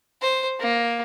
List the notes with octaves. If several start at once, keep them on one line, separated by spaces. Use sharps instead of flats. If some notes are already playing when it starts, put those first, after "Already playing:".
C5
A#3